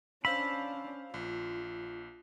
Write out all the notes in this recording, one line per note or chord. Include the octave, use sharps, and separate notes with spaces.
C#4 D4 C5 F5 B5 E6
A#1 F4